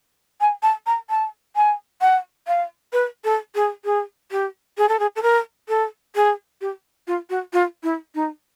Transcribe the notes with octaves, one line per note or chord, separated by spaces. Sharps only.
G#5
A5
A#5
A5
G#5
F#5
F5
B4
A4
G#4
G#4
G4
G#4
A4
G#4
A4
A#4
A4
G#4
G4
F4
F#4
F4
E4
D#4